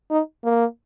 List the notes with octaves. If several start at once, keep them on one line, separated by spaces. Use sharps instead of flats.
D#4
A#3